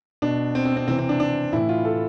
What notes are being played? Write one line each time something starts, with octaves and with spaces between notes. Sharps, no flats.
B2 D4
C4
C4
C4
C3 E3 C4
C4
D4
D4
A2 E3 E4
F4
A4